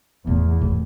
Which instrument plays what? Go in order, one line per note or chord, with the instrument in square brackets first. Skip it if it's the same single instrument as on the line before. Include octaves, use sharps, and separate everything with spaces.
[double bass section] E2 [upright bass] A2
[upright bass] A2